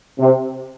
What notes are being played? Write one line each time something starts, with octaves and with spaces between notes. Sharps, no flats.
C3